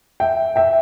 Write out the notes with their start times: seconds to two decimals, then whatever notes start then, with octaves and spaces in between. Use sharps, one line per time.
0.20 E5 G5
0.56 E5 G5